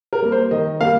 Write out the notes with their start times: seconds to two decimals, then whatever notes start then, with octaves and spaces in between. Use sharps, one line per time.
0.13 A#4
0.22 G3 A#3
0.32 C5
0.51 D#3 D#5
0.81 G3 A#3 F5